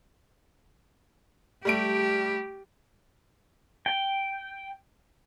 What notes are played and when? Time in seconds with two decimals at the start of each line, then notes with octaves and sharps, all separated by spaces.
1.65 G3 A3 G4 D7
3.86 G5